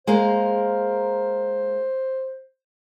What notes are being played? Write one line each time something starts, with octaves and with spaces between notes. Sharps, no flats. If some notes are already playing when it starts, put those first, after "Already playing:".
G#3 A#3 A#4 C5